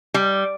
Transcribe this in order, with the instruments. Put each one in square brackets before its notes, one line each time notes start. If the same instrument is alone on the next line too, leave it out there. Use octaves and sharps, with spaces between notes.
[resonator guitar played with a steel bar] G3